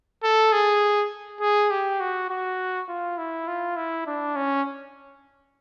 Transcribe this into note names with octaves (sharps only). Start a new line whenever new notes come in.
A4
G#4
G#4
G4
F#4
F#4
F4
E4
F4
E4
D4
C#4